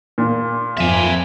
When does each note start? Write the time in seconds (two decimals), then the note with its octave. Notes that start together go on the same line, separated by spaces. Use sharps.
0.18 A#2
0.77 F2 E5 G#5